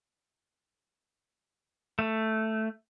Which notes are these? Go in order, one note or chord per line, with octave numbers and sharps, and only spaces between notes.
A3